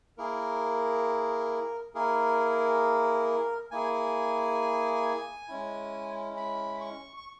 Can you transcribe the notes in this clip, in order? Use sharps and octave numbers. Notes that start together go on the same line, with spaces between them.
A#3 E4 G#4 A#4
A#3 E4 G#4 A#4
A#3 E4 G#4 G#5
G#3 C#4 E4
B5
C#6
C#6